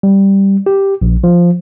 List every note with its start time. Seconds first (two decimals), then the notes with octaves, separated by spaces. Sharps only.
0.03 G3
0.66 G4
1.02 A#1
1.24 F3